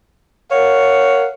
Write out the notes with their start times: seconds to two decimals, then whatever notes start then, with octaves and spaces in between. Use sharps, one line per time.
0.51 A#4 C#5 F5 F#5